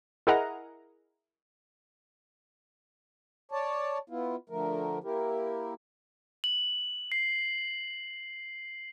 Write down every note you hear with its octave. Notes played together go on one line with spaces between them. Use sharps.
E4 G#4 A#4 D#5 F#5 A#5
C#5 D5 A5
B3 E4 F4
D3 F3 A3 A#4
A#3 E4 G4 A#4
F#7
C7